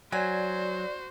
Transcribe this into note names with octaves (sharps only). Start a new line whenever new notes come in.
F#3 F#4 C5 D5 G#5